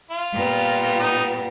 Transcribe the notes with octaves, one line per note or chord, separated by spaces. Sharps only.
F4
A#2 G3 B3
D#4